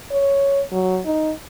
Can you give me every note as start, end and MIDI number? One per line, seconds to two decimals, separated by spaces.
0.12 0.62 73
0.72 1.00 54
1.06 1.32 63